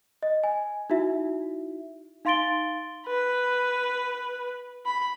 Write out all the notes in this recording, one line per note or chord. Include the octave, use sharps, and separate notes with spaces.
D#5
G#5
D#4 E4 F#4 E5
D#4 F5 C6 A6 D7 G7
B4
B5